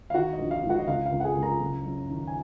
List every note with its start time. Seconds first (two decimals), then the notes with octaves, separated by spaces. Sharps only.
0.10 F5
0.14 D#3 F#4 F#5
0.33 D#5
0.39 A#1
0.51 F5
0.63 G#2
0.69 F#4 F#5
0.79 D#5
0.87 C#2 F5
1.06 F5
1.12 C#2
1.20 F#5
1.24 G#4 G#5
1.37 C#2
1.43 A#4 A#5
1.60 F#1
1.85 F#2
2.10 D#3
2.27 G#5